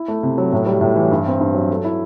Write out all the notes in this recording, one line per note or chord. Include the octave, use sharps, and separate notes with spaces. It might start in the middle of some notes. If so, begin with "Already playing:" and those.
Already playing: E4
A3
C3
F#3
A2
G3
A2
E3
G2
C4
G2
F#3
A4
E4